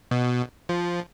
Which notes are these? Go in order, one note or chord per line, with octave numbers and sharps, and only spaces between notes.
B2
F3